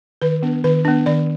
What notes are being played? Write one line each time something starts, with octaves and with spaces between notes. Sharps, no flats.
D#3 B4
B3 D4
D#3 B4
B3 D4
D#3 D5